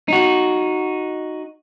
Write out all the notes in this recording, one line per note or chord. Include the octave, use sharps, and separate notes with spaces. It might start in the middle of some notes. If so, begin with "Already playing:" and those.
D#4 F#4